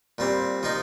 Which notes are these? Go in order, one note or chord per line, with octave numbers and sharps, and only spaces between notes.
A#2 G3 C4
F3 A#3 D#4